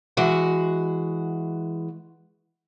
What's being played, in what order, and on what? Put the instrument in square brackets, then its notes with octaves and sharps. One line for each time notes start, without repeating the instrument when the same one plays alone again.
[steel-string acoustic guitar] E3 G#3 F#4 F#5